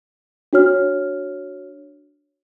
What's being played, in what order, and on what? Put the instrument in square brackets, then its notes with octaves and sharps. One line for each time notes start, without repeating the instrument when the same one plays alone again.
[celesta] D4 F#4 C#5 F6